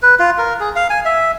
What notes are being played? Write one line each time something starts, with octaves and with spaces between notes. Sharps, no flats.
B4
F4
A#4
G#4
F5
G#5
E5